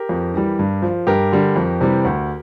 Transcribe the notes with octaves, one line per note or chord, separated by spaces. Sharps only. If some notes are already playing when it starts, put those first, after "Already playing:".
Already playing: G4 A#4
F2
E3 G3
G2
F3
G2 G4 A#4
D3 G3
F2
C3 E3 G3
D2